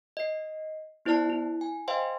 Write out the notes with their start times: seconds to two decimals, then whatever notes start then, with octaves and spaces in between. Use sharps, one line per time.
0.17 D#5 C7
1.05 B3 E4 C5 D5 A5 C7
1.30 E4
1.61 G#5
1.88 C5 D#5 F5 G5 G#5 C6